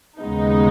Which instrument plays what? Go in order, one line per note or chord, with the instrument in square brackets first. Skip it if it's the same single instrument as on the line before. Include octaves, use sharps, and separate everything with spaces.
[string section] D#2 C#3 G#3 B3 D#4